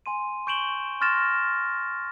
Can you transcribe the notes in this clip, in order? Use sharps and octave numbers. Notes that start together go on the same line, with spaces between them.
G#5 C6 D#7
C#6 G6 D7 E7 F#7 G7
C6 C#6 F6 A6 A#6 E7